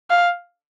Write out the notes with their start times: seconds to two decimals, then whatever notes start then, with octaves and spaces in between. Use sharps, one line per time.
0.10 F5